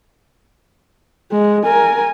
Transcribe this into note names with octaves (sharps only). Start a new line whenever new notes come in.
G#3
A#4 G#5